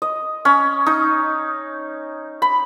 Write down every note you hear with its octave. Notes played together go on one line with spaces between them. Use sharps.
D#5
C#4
D#4
B5